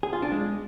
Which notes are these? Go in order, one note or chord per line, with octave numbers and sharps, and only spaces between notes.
G#4
F4
D4
G#3